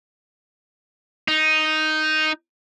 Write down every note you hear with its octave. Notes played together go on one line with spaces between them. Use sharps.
D#4